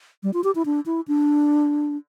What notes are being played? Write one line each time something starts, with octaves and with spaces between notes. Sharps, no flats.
G3
F4
G4
E4
D4
E4
D4